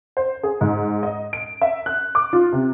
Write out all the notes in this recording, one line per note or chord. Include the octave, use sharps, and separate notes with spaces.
C5
G#4
G#2
D#5
D7
E5
F#6
D6
F4
C3